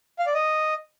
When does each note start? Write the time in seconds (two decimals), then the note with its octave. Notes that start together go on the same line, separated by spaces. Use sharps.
0.19 F5
0.27 D5
0.34 D#5